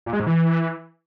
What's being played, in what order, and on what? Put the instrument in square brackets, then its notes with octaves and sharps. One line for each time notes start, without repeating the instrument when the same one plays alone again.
[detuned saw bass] A#2
G#3
G#2
E3